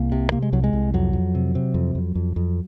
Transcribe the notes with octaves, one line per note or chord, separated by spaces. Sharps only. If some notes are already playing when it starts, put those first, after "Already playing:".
Already playing: C2 A#3
C3
C3 A#3
G#3
C2 F#3
G#3
C2
F2 F#3
F2
C3
C3
F2
F2
F2
F2